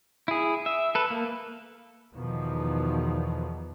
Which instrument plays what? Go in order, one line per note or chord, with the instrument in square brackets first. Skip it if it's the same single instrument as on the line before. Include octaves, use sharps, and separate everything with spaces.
[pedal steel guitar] E4 G#4
E5
A4 B4
A#3
[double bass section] E2 B2 D#3 F3